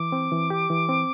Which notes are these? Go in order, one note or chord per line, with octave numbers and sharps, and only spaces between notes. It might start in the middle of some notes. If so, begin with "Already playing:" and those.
Already playing: E3 D6
C4
E3
G4
E3
C4